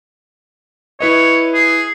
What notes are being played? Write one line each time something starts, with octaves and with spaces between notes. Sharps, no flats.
E4 B4 C#5 D#5
G#4